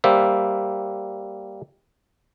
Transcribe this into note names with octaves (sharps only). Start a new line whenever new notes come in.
G3 A#3 C5 E5